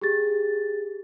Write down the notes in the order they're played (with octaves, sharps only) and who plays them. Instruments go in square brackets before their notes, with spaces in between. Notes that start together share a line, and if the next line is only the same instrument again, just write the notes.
[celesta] G4 G#4 A6